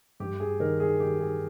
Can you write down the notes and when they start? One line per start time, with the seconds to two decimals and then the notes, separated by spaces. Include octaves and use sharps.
0.20 G2 G4
0.40 G#4
0.60 D#3 A#4
0.80 G#4
1.00 D#3 G4
1.20 G#4